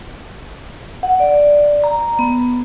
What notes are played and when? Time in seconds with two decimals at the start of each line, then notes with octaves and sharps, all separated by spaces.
1.03 F#5
1.20 D5
1.84 A#5
2.19 B3